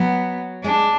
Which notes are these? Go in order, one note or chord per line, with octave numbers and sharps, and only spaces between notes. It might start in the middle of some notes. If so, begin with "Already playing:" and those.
Already playing: F#3 B3
G#3 D4